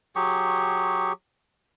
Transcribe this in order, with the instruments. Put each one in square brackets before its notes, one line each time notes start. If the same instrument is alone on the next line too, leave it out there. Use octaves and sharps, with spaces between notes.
[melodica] F#3 G4 G#4 C#6